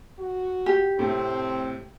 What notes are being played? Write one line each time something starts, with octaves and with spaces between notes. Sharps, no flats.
F#4
G4
A2 C3 A3 C4